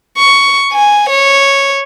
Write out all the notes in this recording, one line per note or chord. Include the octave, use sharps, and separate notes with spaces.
C#6
G#5
C#5